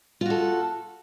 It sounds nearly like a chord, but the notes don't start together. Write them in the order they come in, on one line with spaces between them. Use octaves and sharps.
F4 F#4 A4